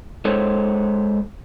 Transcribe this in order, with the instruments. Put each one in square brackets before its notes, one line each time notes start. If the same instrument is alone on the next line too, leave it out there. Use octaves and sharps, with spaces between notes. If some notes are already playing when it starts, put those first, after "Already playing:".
[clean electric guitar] G#3 A4 C5 C#5